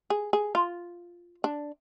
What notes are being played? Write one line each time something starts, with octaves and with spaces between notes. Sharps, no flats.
G#4
G#4
F4
D4